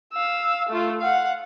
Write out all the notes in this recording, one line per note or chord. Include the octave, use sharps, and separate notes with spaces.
F5 E6
A3 F4
F5 F#5